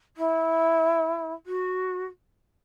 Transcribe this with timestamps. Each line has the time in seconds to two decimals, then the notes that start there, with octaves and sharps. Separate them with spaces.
0.16 E4
1.46 F#4